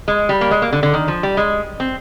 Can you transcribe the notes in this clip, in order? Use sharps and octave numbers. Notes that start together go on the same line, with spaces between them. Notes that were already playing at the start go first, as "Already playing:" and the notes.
G#3
G3
A#3
G#3
A#3
D3
D3
D#3
F3
G3
G#3
C4